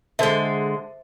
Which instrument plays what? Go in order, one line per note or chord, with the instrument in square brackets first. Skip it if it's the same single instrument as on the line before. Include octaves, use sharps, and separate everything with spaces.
[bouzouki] D3 G#3 [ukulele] A4 C5 E5